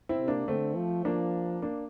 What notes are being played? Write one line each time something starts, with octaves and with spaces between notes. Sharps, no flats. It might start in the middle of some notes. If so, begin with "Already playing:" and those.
C4 E4
C3
A#3 D4
D3 A3 C4
F3
F3 A#3 D4
A#3 D4